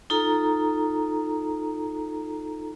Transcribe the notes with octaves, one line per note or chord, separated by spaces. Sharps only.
D#4 F4 A4 A#5